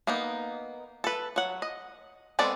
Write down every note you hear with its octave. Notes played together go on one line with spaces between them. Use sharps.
A#3 B3 D#4
A4 B4
F#3 F#5
D#5
G#3 B3 C4 A4 D5